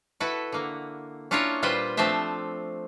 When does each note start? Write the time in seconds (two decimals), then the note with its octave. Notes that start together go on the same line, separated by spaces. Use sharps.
0.20 E4 F#4 A4 B4
0.52 D3 A#3
1.31 C#4 D4 E4 F4 A#4 C#5
1.62 A#2 G3 F4 B4 C5 G5
1.97 F3 A3 C4 D4 C5 E5